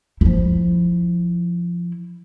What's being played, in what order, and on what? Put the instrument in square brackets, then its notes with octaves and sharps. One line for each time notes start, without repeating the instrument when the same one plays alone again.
[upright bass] F3 E4